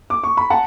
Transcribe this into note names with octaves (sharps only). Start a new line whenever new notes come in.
D6
C#6
B5
F#5 A5